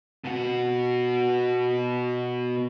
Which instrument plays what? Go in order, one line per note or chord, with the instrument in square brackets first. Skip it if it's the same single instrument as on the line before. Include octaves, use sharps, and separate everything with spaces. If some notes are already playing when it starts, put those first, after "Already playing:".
[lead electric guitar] B2 F#4